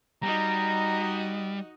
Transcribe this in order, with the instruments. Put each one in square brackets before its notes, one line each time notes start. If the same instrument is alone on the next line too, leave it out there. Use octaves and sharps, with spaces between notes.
[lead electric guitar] G3 [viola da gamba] D#4 F#4 D#5 [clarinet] A#5